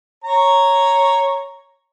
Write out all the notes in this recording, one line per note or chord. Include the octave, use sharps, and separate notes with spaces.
C#5 A#5